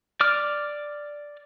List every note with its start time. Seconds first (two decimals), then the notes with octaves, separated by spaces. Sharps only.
0.21 D5 D6 F6